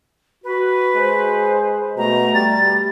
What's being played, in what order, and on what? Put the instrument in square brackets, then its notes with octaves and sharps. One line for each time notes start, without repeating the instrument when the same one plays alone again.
[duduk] F#4 [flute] B4
[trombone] G#3 [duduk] C5
[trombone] B2 [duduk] A3 [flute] A#5
[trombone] G3 [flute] A6